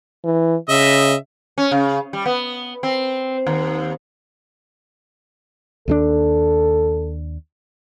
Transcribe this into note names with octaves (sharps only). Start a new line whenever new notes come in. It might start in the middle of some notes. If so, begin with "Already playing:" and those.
E3
C#3 D#5 E5
C#4
C#3
G3
B3
C4
D#2
D#2 G3 D4 A4